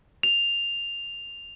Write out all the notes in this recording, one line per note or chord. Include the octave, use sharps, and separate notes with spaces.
F7